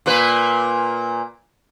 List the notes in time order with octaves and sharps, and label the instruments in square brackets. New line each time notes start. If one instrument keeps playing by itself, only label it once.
[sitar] A#2 A#3 B4